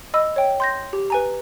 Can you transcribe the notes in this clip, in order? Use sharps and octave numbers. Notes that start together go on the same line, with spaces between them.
D#5 B5 E6
C#5 G5
C6 G6 A#6
G4
B4 G#5 A#5